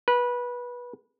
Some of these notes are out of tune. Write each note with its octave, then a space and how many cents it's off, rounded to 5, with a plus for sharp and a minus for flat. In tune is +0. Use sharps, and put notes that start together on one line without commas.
B4 -20